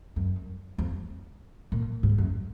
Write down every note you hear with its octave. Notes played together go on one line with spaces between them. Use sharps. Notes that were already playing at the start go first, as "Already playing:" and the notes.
F#2
F2
A#2
G#2
F#2